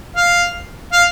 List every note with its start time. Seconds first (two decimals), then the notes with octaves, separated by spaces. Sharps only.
0.16 F5
0.93 F5